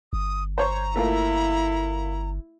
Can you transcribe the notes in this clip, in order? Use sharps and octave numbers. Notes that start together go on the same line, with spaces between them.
G1 D#6
C5 C#5 A#5
A3 A#3 E4 F4